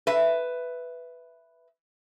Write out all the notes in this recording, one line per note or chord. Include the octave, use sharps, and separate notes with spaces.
B4 E5